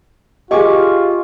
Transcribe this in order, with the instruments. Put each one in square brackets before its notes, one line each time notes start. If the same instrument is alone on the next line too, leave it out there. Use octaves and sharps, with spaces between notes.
[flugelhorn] F4 [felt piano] G4 G#4 [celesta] D#5 [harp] G#5 C#6 D6